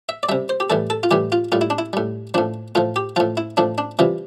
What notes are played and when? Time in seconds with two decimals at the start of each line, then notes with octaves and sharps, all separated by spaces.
0.09 E5
0.23 D5
0.29 C3 G3 E5
0.49 C5
0.60 G4
0.70 A2 E3 G3 A4
0.90 A4
1.03 F4
1.11 A2 E3 G3 G4
1.32 F4
1.52 A2 G3 F4
1.61 E4
1.70 D4
1.78 E4
1.93 A2 G3
2.34 A2 F3 D4
2.75 A2 F3 F4
2.96 G4
3.16 A2 F3 F4
3.37 E4
3.57 A2 F3 D4
3.78 D4
3.99 C3 E3 G3 F4